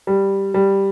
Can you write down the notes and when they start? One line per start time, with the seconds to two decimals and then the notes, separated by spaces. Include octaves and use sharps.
0.07 G3
0.54 G3